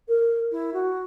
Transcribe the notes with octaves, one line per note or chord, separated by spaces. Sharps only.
A#4
E4
F#4